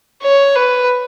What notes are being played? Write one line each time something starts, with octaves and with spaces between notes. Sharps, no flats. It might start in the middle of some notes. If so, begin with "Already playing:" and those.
C#5
B4